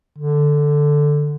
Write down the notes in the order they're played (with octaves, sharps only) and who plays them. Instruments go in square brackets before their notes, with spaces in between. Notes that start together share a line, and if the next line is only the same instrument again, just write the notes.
[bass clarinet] D3